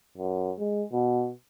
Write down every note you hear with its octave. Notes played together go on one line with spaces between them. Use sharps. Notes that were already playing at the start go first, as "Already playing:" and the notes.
F#2
G#3
B2